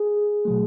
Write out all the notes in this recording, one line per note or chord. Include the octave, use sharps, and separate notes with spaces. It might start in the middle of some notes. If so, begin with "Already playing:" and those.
Already playing: G#4
B2 F#3 A3